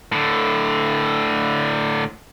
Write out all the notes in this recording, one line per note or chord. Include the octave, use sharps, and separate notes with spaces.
A2 D3